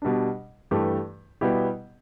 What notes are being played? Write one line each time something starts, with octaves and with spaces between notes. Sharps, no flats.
B2 G3 D4
G2 E3 A3 G4
B2 G3 B3 E4 G4